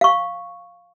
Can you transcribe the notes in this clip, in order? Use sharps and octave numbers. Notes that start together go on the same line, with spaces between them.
F5 C#6